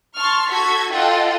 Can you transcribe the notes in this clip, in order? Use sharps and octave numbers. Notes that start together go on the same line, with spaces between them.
A5 C6 C#6 F6
F#4 A4 C#6 G#6 B6
F4 A4 D#5 F#5 G5